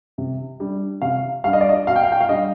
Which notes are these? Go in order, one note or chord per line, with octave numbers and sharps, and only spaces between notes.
C3
G3 D4
C3 F5
G3 D4 F5
D#5
D5
D#5
B2 F5
G5
F5
G5
F5
G3 D4 D#5